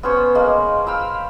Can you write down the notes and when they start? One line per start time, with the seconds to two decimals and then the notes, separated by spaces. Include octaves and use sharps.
0.03 B3 C#4 C5 C#5
0.35 G#3 A#3 F#5
0.87 F5 G5 B5 E6